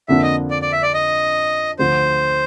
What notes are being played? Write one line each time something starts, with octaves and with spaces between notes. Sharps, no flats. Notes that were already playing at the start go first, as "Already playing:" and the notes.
F2 D3 F3 A#3 D4 E5
D#5
D5
D5
E5
D5
D#5
D2 D3 F3 C5